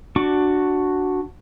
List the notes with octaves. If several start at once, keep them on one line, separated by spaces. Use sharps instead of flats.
D4 F#4 C#6 D6